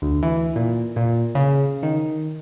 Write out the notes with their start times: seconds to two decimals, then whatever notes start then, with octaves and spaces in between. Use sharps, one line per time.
0.02 D2
0.23 E3
0.56 A#2
0.96 A#2
1.35 C#3
1.83 D#3